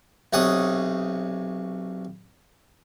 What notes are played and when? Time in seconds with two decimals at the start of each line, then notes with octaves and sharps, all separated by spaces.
0.33 B1 C3 C#5 F#5 D#6